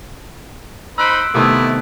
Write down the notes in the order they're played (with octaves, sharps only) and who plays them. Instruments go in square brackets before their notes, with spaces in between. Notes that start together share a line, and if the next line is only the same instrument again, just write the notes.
[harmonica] D#4 C5 B5 [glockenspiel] E6 F#6 D7
[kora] C3 D#3 [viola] A3 B3 [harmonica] E4